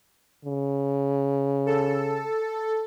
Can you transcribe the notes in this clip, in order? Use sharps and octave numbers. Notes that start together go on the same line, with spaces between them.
C#3
A4